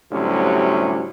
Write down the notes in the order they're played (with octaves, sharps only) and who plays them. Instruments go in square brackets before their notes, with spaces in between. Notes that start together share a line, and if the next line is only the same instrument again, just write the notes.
[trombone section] D2 A2 C3 F#3 G3 C#4